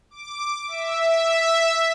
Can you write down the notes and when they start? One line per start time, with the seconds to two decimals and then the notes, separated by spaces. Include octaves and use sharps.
0.11 D6
0.67 E5